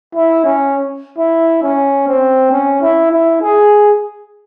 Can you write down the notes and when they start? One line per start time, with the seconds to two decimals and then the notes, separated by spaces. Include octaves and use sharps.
0.15 E4
0.44 C#4
1.18 E4
1.63 C#4
2.08 C4
2.52 C#4
2.82 E4
3.12 E4
3.41 G#4